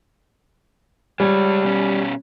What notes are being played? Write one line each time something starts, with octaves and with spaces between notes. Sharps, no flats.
G3 G#3 C#5
B2 C#4